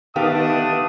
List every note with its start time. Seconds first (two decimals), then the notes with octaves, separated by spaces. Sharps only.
0.16 D#3 A3 B3 D4 G4 F5 D#6